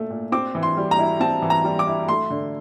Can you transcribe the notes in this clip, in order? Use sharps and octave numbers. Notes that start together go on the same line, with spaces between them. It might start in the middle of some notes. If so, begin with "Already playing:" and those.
Already playing: A#2 A3
A#2
C4 D6
E3
C6
G3
A#5
E4
C4 A5
E3
A#5
G3
D6
E4
A3 C6
D3